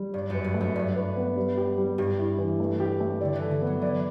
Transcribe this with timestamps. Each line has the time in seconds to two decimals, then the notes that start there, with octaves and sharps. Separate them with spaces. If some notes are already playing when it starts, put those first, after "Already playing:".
Already playing: G3
0.14 G2 D5
0.30 F#2 B4
0.44 G2
0.54 A3
0.61 F#2
0.75 G2 D5
0.96 B4
1.17 B3
1.37 G3
1.57 G4
1.78 G3
1.98 G2 G4
2.18 E4
2.38 E3
2.60 A3
2.80 G4
3.00 A3
3.21 D3 D5
3.35 E3
3.42 A4
3.51 E3
3.61 B3
3.67 F#3
3.82 E3 D5